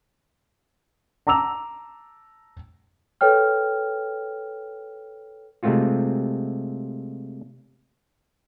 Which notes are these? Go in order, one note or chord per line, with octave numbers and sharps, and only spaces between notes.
A5 A#5 D6 E6 F7
A4 B4 C#5 G5 F6
C3 G#3 A3 C4 F4 F#4